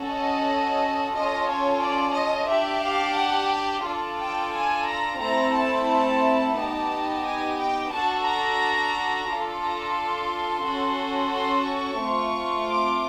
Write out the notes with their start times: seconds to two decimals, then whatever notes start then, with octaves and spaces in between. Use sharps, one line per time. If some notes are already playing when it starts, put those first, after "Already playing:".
Already playing: C#4 F#4 A4
0.12 D#5
1.15 C#4 F4 A4 D#5
1.47 C#5
1.82 D5
2.15 D#5
2.50 D4 G4 E5
2.84 F5
3.18 F#5
3.52 G5
3.85 D4 F4 A4
4.20 G5
4.53 G#5
4.88 A#5
5.21 A3 C4 E4 A4 A#5
5.55 A5
6.56 B3 D#4 G4 A5
7.25 G#5
7.59 G5
7.92 D4 F#4 A4 A5
8.26 A#5
9.29 D4 F4 A4
9.62 A#5
9.96 C6
10.64 C#4 F#4 A4
11.32 C6
11.65 C#6
12.00 A3 C4 F4
12.68 D6